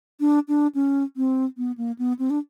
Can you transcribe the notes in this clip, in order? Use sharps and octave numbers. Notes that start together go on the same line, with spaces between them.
D4
D4
C#4
C4
B3
A#3
B3
C4
D4